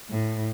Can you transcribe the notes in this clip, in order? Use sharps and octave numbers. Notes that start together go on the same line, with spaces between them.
A2